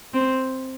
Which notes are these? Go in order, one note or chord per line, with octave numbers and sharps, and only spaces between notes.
C4